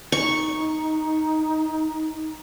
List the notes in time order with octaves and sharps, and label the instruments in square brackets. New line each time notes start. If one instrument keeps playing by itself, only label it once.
[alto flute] D#4 [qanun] C#6